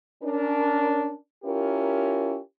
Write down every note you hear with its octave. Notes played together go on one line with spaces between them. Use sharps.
C#4 D4 A#4
C#4 E4 F4 G4 A#4